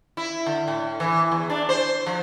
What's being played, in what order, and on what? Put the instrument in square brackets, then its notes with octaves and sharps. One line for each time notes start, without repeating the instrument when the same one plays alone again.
[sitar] E4
D3
A2
E3
E2
D4
C5
F3